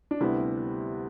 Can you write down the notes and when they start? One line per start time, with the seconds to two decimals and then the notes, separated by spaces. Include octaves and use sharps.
0.11 D4
0.20 D2 C3 G3 B3 E4